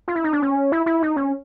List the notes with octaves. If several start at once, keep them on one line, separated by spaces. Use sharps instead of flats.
F4
E4
D#4
D4
C#4
E4
E4
D#4
C#4